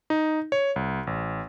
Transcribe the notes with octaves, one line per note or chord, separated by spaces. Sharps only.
D#4
C#5
C2
A1